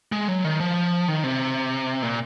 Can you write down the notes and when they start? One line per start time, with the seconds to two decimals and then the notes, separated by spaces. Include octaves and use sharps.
0.12 G#3
0.28 F#3
0.44 D#3
0.60 F3
1.08 D#3
1.24 C3
2.03 A#2